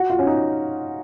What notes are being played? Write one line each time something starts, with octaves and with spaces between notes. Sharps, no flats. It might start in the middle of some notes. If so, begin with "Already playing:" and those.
Already playing: F#4
F4
C#4
D#4